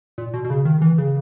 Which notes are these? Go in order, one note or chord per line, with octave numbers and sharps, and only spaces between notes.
A#2
B2
B2
C#3
D#3
E3
C#3